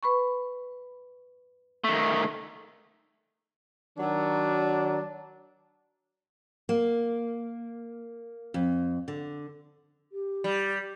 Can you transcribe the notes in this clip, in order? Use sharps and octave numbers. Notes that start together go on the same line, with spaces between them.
B4 B5 C#6
D#3 A3
D#3 F#3 D4
A#3
F2
D3
G4
G3